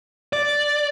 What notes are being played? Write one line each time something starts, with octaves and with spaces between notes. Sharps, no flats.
D5